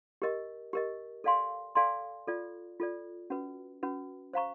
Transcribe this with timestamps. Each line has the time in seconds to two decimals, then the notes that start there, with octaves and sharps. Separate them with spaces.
0.22 G4 A#4 D#5
0.73 G4 A#4 D#5
1.24 A4 D5 F5 G#5 C6
1.75 A4 D5 F5 G#5 C6
2.28 F4 A4 D5
2.80 F4 A4 D5
3.30 C#4 F#4 B4
3.83 C#4 F#4 B4
4.33 C5 F5 A#5 C#6